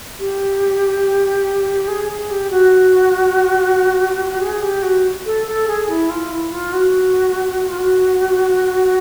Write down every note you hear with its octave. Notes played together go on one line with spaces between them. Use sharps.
G4
G#4
G#4
G4
F#4
G#4
G4
F#4
A4
A4
G#4
E4
F4
E4
F4
F#4
F4
F#4